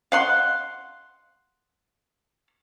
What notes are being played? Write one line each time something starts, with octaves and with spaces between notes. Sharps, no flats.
F5 F#5 C6